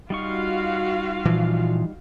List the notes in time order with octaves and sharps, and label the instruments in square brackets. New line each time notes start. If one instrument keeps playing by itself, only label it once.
[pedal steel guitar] G3 D#4 C#6 [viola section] F4 F#4 F5
[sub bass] A#2 [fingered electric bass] E3 F3